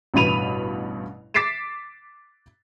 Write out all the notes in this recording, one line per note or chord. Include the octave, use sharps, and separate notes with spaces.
A1 G2 B2 B5 D#7 F7
D6 A6 B6 C7 D7 E7